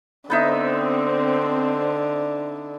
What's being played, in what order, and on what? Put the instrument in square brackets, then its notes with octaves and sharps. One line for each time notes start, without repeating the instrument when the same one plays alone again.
[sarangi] D3 [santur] B3 D#4 E5 [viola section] C4